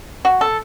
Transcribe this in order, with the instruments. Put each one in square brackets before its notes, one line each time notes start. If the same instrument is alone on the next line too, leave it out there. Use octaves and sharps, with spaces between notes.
[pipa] F#4
A4